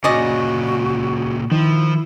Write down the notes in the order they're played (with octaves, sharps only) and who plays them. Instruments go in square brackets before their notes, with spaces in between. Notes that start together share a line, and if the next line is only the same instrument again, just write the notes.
[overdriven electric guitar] A#2 C#3 [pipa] C#4 D5 D#5 [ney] F#4
[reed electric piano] D#3 [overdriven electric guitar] F3 [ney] E4